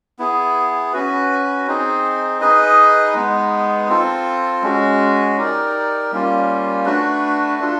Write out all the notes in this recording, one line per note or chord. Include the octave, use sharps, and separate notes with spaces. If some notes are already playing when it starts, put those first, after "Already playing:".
B3 E4 G#4
C#4 F#4 B4
C4 D#4 G#4
D#4 G#4 B4 D#5
G#3 B3 D#4
C4 F4 A4
G#3 C#4 F#4
D#4 G4 A#4 D5
G3 A#3 C#4 F4
A3 D4 F#4 B4
D4 F4 A4